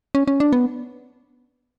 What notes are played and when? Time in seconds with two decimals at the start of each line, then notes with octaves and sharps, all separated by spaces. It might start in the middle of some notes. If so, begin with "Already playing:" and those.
0.15 C#4
0.28 C#4
0.40 D4
0.53 B3